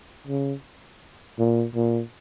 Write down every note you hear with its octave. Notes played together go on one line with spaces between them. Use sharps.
C#3
A#2
A#2